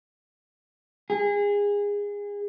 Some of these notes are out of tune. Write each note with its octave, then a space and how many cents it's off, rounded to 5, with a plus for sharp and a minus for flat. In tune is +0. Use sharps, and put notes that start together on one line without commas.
G#4 -25